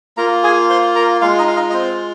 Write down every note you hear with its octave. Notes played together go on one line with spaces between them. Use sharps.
A#3 F4 A#4 A#5
G#4 G#5
C5 C6
A#4 A#5
G#3 F4 F5
D#4 D#5
F5
D#4 D#5
D#5
C4 C5